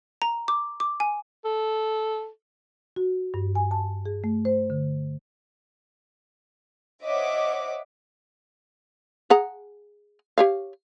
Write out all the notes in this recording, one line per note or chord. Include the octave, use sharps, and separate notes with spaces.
A#5
D6
D6
G#5
A4
F#4
G2
G#5
A5
G#4
A3
C5
D3
C5 C#5 D#5 E5 F#5 D6
G#4 F#5 A#5
G4 C#5 F5